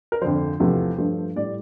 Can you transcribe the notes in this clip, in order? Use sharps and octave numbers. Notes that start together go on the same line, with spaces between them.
A#4
F2 D3 F3 C5
E2 C3 F3 A3
G2 F3 A3
A2 G3 D5